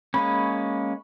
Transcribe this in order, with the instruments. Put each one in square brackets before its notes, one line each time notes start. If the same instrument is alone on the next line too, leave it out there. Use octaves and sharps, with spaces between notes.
[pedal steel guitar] G#3 A#3 C#4 [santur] B5 C#6